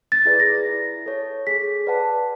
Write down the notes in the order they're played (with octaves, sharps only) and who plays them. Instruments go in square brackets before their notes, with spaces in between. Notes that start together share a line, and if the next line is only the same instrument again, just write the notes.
[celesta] A6
[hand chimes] E4 G#4 B4 D5
[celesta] A#6
[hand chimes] E4
A4 C#5
[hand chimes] G#4 [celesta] B6
[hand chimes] B4 D5 F#5 A5